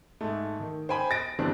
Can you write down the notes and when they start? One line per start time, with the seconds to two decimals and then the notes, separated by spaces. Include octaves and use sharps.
0.21 G#2 A3
0.60 D#3
0.89 C5 G5 G#5 B5
1.11 A6 A#6 D7
1.39 G1 E3 G3 C4 D4